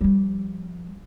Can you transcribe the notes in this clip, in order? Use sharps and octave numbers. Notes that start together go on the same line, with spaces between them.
F3 G3